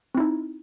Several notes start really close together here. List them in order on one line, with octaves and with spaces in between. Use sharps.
C4 E4 D#4